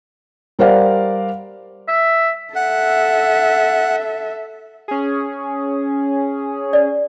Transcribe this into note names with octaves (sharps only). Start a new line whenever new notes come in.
G3 A#4 C5 D5 F5 F#5
E5
A4 E5 F#5
C#4 G#4
D5